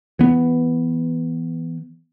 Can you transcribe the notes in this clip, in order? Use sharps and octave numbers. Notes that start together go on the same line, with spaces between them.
E3 B3